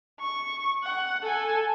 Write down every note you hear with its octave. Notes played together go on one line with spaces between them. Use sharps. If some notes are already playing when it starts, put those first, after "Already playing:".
C#6
F#5
A4 G#5